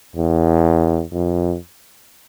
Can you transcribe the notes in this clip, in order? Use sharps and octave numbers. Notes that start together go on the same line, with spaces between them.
E2
F2